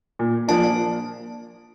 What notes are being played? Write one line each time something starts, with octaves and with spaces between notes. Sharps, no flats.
A#2
F3 A#3 D4 A5